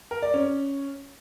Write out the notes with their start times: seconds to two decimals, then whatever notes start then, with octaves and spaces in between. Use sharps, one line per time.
0.11 A#4
0.22 D5
0.34 C#4